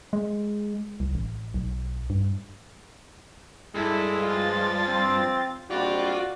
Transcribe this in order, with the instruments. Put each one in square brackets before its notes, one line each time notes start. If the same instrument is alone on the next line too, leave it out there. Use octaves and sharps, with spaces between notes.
[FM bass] G#3
C2
A1
B1
G2
[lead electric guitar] G2 [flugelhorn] G#3 [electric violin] E4 A4
[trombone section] F3 [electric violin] F4 A6
[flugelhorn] C4
[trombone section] A#1 G3 C4 [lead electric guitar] F4 [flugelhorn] F#4 [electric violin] D5